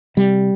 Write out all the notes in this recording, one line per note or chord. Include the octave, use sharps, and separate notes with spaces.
C3 G3